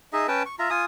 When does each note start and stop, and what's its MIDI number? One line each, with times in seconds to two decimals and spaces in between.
0.13 0.27 63
0.13 0.27 68
0.13 0.27 75
0.13 0.27 76
0.28 0.43 61
0.28 0.43 71
0.28 0.43 79
0.28 0.43 81
0.46 0.56 85
0.59 0.70 65
0.59 0.70 76
0.59 0.70 82
0.70 0.85 65
0.70 0.85 80
0.70 0.85 87